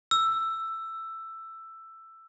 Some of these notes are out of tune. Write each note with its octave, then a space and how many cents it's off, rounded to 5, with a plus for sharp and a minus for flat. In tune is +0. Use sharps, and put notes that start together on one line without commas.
E6 +10